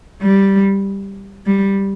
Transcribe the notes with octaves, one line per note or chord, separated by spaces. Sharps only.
G3
G3